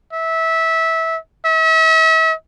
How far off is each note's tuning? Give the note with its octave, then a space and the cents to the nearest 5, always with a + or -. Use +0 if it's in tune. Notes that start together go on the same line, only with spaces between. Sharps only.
E5 -20
E5 -40